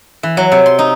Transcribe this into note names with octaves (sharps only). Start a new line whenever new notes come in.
E3
F#3
C3
C6
D#4